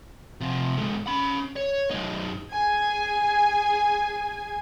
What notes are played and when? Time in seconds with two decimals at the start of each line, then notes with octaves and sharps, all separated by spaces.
0.41 C3 F3
0.77 G#2 D3
1.08 C#4 B5
1.56 C#5
1.91 F#2 D#4
2.52 G#4 G#5